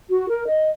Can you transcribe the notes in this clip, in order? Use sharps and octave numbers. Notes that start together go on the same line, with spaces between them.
F#4
A#4
D#5